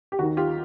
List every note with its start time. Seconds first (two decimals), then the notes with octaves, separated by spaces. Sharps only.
0.12 G4
0.19 D#2 D#3 F#4
0.37 F4 G4